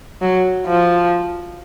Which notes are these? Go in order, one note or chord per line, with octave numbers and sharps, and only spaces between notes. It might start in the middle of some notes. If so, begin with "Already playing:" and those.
F#3
F3